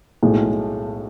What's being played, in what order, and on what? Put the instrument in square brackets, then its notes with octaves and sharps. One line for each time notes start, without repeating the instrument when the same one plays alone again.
[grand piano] B1 A2 G#3